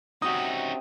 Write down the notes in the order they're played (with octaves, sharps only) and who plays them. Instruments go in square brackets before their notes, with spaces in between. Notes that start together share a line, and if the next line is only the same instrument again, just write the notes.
[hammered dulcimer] C3 C4 G5 [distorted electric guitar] C#4 D#4 [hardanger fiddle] F#4 [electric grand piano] D#6